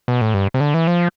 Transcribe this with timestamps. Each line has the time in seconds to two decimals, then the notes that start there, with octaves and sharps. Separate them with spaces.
0.08 B2
0.21 A2
0.34 G2
0.54 C3
0.60 D3
0.74 E3
0.87 F3